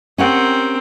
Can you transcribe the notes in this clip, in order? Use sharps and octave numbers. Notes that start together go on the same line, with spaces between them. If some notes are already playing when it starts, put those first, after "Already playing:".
C4 C#4 G4 A#4 F#5